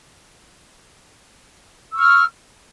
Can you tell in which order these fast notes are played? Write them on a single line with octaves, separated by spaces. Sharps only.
E6 C#6 F6